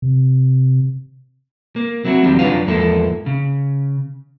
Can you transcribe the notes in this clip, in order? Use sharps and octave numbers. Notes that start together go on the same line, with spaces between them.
C3
A#3
F#3 C4 E4 F#4
D#2 D#3 F3 G3 C4
F#2 F#3 D4 F4 B4 F5
E2 G#2 F3 A#3 E4 A4
C#3